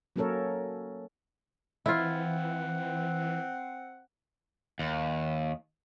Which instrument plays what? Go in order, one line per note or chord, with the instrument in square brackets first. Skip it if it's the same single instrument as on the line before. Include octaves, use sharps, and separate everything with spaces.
[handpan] F#3 A#3 C#4 A4 A#4 C#5
[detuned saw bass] E3 [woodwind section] C4 F#5 [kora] E4 F4
[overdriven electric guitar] D#2